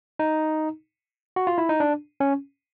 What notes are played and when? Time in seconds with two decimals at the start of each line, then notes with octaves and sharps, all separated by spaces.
0.19 D#4
1.36 F#4
1.47 F4
1.58 E4
1.69 D#4
1.80 D4
2.20 C#4